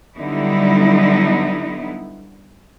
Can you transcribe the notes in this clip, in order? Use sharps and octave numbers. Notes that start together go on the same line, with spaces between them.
D3 F#3 G3 B3 D#4 E4